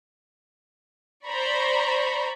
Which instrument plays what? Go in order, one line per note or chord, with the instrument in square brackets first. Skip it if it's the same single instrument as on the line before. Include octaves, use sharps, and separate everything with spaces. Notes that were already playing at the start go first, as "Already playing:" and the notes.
[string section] C5 D5 A#5 B5 C#6